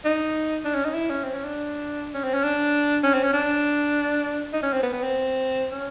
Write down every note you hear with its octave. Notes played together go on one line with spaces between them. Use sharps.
D#4
D4
C#4
D#4
E4
C#4
C4
C#4
D4
C#4
C4
C#4
D4
C#4
C4
C#4
D4
D#4
C#4
C4
B3
B3
C4
C#4